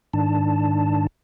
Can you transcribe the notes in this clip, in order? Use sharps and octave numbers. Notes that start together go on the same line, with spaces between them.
G#2 D#3 D4 A5